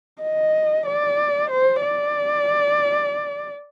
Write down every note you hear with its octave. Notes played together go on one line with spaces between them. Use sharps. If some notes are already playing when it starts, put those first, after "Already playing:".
D#5
D5
C5
D5